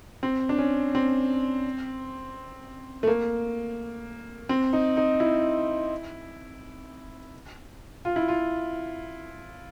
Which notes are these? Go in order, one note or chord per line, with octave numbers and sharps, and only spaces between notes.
C4
D4
C#4
C4
A3
A#3
C4
D#4
D#4
E4
F4
E4
F4